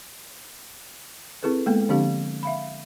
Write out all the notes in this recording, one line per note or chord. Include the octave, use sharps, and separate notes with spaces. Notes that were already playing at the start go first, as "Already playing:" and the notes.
C4 E4 G#4 A4 B4
G#3 A#3 B3 A4
D3 F3 C4 D4 G4 F5
E5 F5 B5